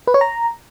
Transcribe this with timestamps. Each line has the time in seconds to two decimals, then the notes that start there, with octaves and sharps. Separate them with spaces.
0.07 B4
0.14 C#5
0.21 A#5